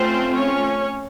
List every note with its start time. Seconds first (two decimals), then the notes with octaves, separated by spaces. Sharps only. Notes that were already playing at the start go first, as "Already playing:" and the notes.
Already playing: A3 C4 C#4 F4 C5
0.34 C#4 C#5